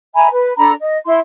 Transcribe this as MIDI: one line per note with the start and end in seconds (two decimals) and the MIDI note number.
0.15 0.28 76
0.15 0.28 80
0.15 0.28 82
0.15 0.28 83
0.31 0.53 71
0.57 0.73 62
0.57 0.73 69
0.57 0.73 82
0.57 0.73 83
0.80 0.97 75
1.06 1.19 64
1.06 1.19 84